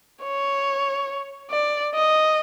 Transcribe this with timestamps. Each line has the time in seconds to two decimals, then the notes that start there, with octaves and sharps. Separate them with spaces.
0.23 C#5
1.51 D5
1.95 D#5